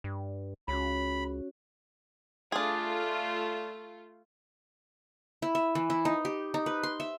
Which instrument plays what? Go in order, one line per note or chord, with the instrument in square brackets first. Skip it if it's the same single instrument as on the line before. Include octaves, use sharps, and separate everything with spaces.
[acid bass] G2
[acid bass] C#2 [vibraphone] C#4 F#4 C#5 [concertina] B5
[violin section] A3 F4 [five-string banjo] D4 G#4
[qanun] E4
E5
E3
E4
D#4
G4
D#4
B4
C6
E5